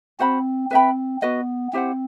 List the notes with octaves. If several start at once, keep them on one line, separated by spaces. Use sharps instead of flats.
C4 F#4 C5 F#5 B5
C4 B4 E5 G5 B5
B3 F#4 B4 D#5
C4 E4 G4 C5 F#5